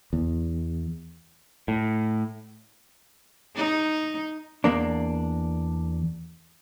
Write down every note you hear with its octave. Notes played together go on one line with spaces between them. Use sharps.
E2
A2
D#4
E2 A#3 D4